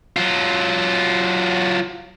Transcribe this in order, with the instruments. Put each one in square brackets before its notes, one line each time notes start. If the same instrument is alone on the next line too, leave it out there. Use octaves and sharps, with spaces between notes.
[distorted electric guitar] F#3 F4